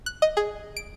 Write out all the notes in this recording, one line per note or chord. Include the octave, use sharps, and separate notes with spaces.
F#6
D#5
G#4
D7